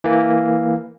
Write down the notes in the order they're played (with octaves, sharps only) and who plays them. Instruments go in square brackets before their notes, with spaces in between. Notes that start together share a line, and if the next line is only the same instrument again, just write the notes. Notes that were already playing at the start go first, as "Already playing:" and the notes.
[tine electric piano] E3 A#3